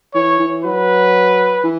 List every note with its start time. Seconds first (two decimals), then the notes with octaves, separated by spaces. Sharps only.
0.14 E3 C#5
0.40 E3
0.64 F#3 B4
1.64 E3